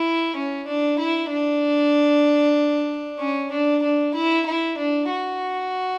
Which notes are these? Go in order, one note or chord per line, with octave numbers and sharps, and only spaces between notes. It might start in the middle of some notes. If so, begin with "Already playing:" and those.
Already playing: E4
C#4
D4
E4
D4
C#4
D4
D4
E4
E4
D4
F#4